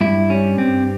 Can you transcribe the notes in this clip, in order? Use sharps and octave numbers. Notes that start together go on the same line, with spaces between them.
G2 E4
G3 C#4
G2 C4